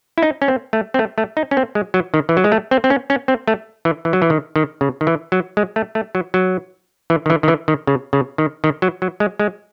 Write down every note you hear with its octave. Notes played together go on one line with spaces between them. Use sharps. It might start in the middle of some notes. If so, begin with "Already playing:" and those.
E4
D#4
C#4
C4
A3
C4
A3
A3
D#4
C#4
C4
G#3
F#3
D#3
E3
F#3
G#3
A3
C4
C4
C#4
C#4
C4
A3
E3
E3
F#3
E3
D#3
D#3
C#3
D#3
E3
F#3
G#3
A3
A3
F#3
F#3
E3
D#3
E3
D#3
E3
D#3
C#3
C#3
D#3
D#3
F#3
F#3
G#3
G#3